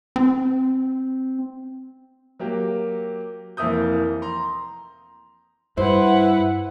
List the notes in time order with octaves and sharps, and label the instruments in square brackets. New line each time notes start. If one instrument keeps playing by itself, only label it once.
[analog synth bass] C4
[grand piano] F#3 A#3 G4
F1 E3 A#3 E5 D#6 G6
A#5 C6
[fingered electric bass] G2 [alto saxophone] E4 [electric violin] B4 F#5 [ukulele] C5